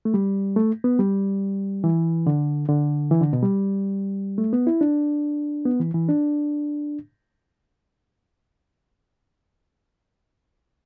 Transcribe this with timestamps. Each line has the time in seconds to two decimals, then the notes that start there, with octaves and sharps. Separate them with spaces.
0.05 A3
0.14 G3
0.56 A3
0.84 B3
0.99 G3
1.84 E3
2.27 D3
2.68 D3
3.11 E3
3.21 D3
3.33 B2
3.43 G3
4.38 A3
4.53 B3
4.67 E4
4.81 D4
5.65 B3
5.80 E3
5.94 E3
6.08 D4